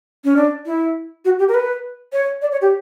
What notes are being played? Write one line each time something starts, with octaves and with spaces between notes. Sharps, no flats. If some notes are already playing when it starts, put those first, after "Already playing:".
C#4
D4
E4
F#4
G4
A#4
B4
C#5
D5
C#5
G4